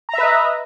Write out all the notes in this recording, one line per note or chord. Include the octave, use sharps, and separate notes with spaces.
B4 D#5 E5 A#5